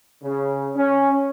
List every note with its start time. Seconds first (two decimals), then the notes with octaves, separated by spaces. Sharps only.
0.23 C#3
0.77 C#4